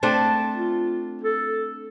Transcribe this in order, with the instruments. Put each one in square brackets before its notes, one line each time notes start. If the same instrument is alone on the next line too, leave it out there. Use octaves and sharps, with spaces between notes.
[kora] A3 C4 D4 [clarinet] A5
[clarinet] F4
A4